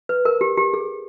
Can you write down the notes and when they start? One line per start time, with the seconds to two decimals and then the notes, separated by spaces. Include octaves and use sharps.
0.09 B4
0.25 A#4
0.41 G4
0.57 G4
0.73 G#4